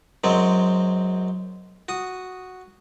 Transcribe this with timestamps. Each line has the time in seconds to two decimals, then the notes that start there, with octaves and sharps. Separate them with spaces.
0.24 F#2 F#3 G#3 C4
1.89 F#4 D#6